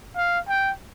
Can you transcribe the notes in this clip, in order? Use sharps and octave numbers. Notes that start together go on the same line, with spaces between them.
F5
G5